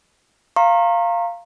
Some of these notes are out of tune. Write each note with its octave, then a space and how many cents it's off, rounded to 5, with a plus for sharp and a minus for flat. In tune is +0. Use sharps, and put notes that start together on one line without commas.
F5 -10 A#5 -10 C#6 -45